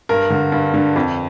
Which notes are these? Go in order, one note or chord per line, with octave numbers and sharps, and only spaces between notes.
G2 A#4
D3
G2
D3
F2